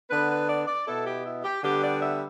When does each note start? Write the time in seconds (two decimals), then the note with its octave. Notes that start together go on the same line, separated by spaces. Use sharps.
0.10 D3 B3 D4 B4
0.30 B4
0.48 D5
0.67 D5
0.86 B2 B3 E4 A4
1.05 G4
1.25 E4
1.44 G4
1.63 D3 G3 B3 G4
1.82 D5
2.01 E5